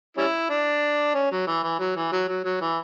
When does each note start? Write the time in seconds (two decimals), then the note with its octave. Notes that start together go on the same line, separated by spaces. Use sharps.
0.17 G3 C#4 E4
0.50 D4
1.15 C#4
1.31 F#3
1.47 E3
1.63 E3
1.80 F#3
1.96 E3
2.12 F#3
2.28 F#3
2.45 F#3
2.61 E3